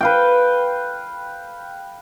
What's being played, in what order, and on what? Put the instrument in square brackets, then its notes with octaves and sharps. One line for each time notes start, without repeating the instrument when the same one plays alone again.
[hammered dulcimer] B4 F5 G5